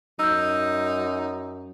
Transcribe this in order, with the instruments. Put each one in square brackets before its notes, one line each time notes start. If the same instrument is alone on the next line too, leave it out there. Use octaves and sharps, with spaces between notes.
[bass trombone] F#2 [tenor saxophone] D#4 [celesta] E6 G6